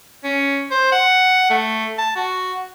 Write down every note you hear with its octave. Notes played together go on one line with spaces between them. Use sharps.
C#4
C5
F#5
A3
A5
F#4